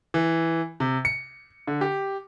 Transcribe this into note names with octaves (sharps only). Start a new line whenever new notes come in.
E3
C3
C#7
D3
G4